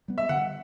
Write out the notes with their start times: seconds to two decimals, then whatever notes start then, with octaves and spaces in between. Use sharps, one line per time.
0.08 G3 B3
0.18 E5
0.29 D3 F#5